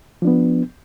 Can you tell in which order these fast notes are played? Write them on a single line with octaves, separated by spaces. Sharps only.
F3 D4 B3